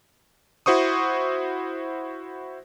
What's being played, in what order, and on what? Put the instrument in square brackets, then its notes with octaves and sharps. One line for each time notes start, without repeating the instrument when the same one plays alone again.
[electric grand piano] E4 F#4 C5 C#6 D#6